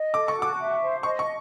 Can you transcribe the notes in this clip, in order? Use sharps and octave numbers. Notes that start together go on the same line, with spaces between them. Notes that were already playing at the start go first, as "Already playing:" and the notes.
Already playing: D#5
A4 D6
C#6
F#4
D6
E5
C5
D#5 C#6
C#6